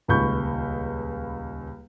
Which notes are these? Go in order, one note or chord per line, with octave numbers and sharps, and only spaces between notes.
D#1 C#2 B5 C#6 G6